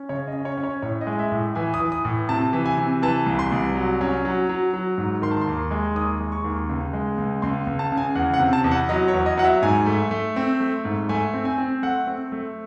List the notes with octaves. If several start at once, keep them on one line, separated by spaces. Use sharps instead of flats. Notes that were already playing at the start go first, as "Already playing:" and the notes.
Already playing: C#4
C#3 C#5
D#5
C#4
C#5
C#4
C#5
A2 C#5
D#5
G#3
E5
A2
E3 G#5
D#6
E3
D#6
A2
C3 A5
E3
G#5
C3
E3 A5
C2
C6
C2
F#3
C#4
F#3
F#3
F#3
G#2
D#3 C6
A5
C6
D#2
G#3
D#2 D#6
G#3
C#6
D#2
C#2
G#3
C#2
C#2 C6
C#2
A5
C#3
G#5
E2 F#5
F#5
C3
A5
E2
F#5
F#3 D#5
C#5
E2
D#5
F#3 F#5
E5
G#2 G#5
A3
A3
C4
A3
G#2
A3 G#5
C4
G#5
C4
A3 F#5
C4
A3